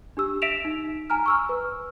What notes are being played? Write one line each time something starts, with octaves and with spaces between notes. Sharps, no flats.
D4 G4 E6
E5 B6 D7 E7 F7
D#4
G#5 A#5 F6
C#6 E6 F6
B4